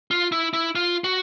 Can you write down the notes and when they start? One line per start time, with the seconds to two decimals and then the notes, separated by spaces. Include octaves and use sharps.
0.11 F4
0.32 E4
0.53 E4
0.75 F4
1.04 F#4